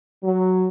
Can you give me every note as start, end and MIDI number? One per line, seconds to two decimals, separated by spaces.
0.24 0.69 54